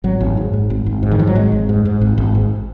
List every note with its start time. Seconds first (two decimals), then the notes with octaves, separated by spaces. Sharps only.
0.04 G#1 F#3
0.21 G#1
0.37 G#2
0.53 G#2
0.70 G#1
0.86 G#1
1.03 G#2
1.11 D#3
1.19 G#2 F3
1.27 F#3
1.35 G#1 G#3
1.52 G#1
1.69 G#2
1.85 G#2
2.01 G#1
2.18 G#1
2.35 G#2